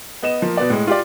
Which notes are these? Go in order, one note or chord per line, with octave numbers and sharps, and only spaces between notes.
B3 D#5 E7
F3 A#3
B2 B3 D5
A2 G#3
F4 G4 D5